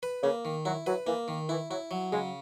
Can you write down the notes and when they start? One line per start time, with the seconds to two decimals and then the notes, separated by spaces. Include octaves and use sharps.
0.03 B4
0.23 C#3 A#3
0.45 D#3
0.65 F#3 E4
0.86 F#3 B4
1.07 E3 A#3
1.28 D#3
1.49 E3 E4
1.70 F#3 E4
1.91 F#3
2.13 C#3 G#3